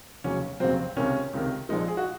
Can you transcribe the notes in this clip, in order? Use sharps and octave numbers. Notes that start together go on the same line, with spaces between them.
F1 D#2 C#3 F#3 C#4
F1 D#2 C#3 F#3 C4
C#2 C3 D#3 C#4
C#2 C3 D#3
A#1 A#2 F3 G#3 D#4
G#4
F#4